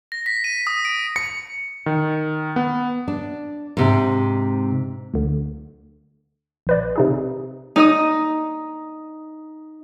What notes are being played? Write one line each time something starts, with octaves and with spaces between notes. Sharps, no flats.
A#6
B6
D#7
D#6
D7
C#7
D#3
B3
D4
G#2 C3
D2 D3
A#1 B4 D5
C3 D#4 G#4
D#4 D#5 D#6